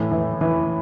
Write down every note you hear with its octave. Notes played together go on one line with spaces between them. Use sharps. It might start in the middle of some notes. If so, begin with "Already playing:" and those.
Already playing: A2 E3
E3
E3